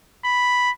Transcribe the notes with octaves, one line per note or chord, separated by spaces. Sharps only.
B5